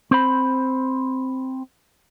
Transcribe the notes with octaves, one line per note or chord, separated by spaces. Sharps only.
C4 C5 B5